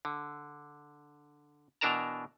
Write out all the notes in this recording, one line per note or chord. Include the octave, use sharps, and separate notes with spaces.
D3
B2 E3 D4 A#4 A5 A#5